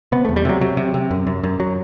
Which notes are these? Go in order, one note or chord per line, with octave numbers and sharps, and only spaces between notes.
C3 B3
A3
E2
G3
C3 F#3
C3 F#3
C3
C3
F#2
F#2
F#2
F#3